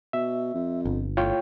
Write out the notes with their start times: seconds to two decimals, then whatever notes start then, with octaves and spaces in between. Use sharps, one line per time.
0.13 B2 E5
0.54 F2
0.85 G1
1.17 A2 F4 C#5 G5